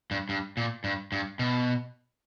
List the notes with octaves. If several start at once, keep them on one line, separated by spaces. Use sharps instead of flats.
G2
G2
A#2
G2
G2
B2